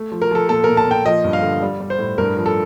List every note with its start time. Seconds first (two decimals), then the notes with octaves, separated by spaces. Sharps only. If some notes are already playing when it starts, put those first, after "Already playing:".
Already playing: A3
0.12 F3
0.22 A#4
0.31 F3 A4
0.49 A#2 A4
0.64 A#4
0.69 A#2
0.77 A5
0.86 A#2 G5
1.05 F3 D#5
1.24 G2
1.33 F5
1.42 D3
1.62 G3
1.80 G3
1.90 C5
1.99 A2
2.18 G2 A#4
2.37 F3
2.46 A4